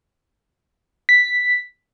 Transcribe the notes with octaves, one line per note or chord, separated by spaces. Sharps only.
B6